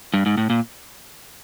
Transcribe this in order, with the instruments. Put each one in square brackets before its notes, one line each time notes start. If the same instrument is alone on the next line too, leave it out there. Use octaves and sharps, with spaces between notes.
[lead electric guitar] G2
G#2
A2
A#2